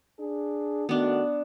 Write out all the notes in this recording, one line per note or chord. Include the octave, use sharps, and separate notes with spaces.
D4 G#4
D#3 A3 B3 D4 F#4